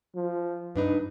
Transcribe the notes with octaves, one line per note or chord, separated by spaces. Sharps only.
F3
G2 D4 D#4 B4